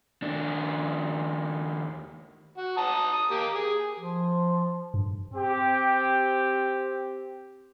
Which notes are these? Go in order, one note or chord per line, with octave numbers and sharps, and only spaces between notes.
D#2 D4
F#4
A5 A#5 D#6
D#6
A#3 G4
G#4
F3
G2
C4 G4 G5